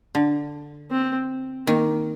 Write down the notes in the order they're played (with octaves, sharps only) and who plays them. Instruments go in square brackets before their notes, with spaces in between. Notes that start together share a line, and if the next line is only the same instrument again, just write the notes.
[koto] D3
[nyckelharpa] C4
[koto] D#3 [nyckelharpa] A#3